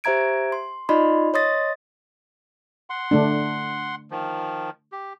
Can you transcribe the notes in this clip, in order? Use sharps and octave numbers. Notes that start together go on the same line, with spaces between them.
G4 C5 E5 A#5 G#6 D7
C6
D#4 F4 D5 D#5 B5 C6
C#5 D#5 C6 D#6 A6 A#6
F#5 C6
D3 A3 D4
D#3 F3
G4